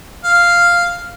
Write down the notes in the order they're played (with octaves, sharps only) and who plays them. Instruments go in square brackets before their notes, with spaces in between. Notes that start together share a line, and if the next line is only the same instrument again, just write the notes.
[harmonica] F5